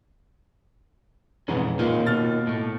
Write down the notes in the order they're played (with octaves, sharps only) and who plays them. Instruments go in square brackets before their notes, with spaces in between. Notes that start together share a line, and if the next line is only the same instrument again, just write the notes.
[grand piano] F2 G#2 B3 [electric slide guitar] B2 E3 C#4
[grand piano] A#2 F4 [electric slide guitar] A#3 D#4
[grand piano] B2 F6 A6
[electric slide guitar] A2 A3